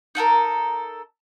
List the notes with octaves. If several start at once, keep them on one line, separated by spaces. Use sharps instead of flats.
D#4 F#4 A4 A#4